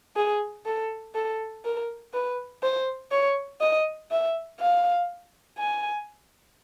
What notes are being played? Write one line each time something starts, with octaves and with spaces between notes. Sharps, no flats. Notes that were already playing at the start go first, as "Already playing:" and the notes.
G#4
A4
A4
A#4
B4
C5
C#5
D#5
E5
F5
G#5